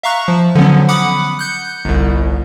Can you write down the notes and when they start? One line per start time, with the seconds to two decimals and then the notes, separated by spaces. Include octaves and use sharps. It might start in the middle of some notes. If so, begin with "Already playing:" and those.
0.03 E5 F5 A#5 C#6 F#6
0.28 F3
0.55 D3 F3 F#3 B3 C#4
0.89 F#5 B5 D6 D#6 F#6
1.39 F#6 G6 C#7
1.85 G1 C2